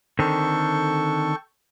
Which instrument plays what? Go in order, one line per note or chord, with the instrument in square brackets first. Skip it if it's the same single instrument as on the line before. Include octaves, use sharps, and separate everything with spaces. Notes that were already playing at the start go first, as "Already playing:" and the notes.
[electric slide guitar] D3 D#3 C4 [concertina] A4 G5 C#6